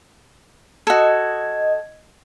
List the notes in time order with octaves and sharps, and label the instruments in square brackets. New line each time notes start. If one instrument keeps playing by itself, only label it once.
[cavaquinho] F#4 A4 [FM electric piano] D#5 G#6